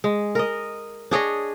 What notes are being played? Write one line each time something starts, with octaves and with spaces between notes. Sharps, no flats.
G#3
A#4 D#5
D4 G#4 C#5 D#5